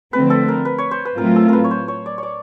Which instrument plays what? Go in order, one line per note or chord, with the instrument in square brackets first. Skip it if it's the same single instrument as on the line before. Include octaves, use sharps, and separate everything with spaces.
[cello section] D3 F3 A3 C4 [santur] B4
[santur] A4
A#4
B4
C#5
C5
B4
[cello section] A2 F#3 A3 C4 F4 [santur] A#4
[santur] A4
A#4 B4
C#5
C5
C#5
D5
C#5 D5